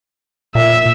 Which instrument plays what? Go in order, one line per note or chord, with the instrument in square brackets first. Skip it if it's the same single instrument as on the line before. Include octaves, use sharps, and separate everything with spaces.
[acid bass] A#2 [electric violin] E5